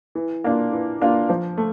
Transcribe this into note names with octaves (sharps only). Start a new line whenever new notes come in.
E3
A#3 D4 F4
E3
A#3 D4 F4
F3
A3